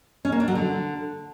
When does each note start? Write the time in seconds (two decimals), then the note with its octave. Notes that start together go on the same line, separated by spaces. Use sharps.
0.25 C#4
0.32 A#3
0.40 D4
0.48 F#3
0.55 D3